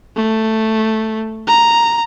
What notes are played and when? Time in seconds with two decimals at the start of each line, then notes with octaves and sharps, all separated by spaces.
0.16 A3
1.47 A#5